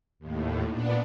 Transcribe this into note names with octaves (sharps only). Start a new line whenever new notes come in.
D#2 A2
A#2 B3 D4